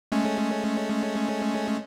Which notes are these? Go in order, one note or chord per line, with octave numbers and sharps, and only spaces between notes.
G#3 A3 C#4